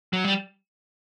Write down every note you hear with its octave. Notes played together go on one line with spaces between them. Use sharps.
F#3
G3